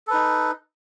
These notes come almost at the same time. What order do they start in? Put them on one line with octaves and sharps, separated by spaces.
A4 B4 D#4